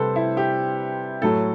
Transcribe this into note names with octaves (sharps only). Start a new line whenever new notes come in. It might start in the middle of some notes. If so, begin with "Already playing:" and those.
Already playing: C3 G3 A4 B4 C5
E4
G4
A2 F#3 A4